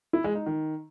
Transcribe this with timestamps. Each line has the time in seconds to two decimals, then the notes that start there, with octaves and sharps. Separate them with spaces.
0.13 E4
0.24 G#3
0.35 D#4
0.46 D#3